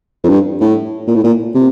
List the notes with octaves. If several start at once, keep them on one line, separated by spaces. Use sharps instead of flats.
F2
G2
A2
A#2
A2
A#2
C3